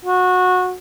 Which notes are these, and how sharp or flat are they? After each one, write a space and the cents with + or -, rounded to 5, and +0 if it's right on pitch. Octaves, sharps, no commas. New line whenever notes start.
F#4 -20